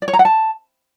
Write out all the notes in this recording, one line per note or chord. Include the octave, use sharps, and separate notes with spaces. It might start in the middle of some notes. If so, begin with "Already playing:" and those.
D5
C#5
A#5
F#5
A5